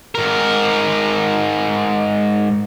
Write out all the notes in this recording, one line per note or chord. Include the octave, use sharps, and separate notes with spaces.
G#2 A#4